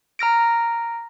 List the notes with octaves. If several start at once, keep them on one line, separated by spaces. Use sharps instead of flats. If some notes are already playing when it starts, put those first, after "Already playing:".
A#5 F6 A#6 D7